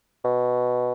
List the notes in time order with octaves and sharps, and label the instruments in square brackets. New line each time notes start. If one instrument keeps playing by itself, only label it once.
[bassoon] B2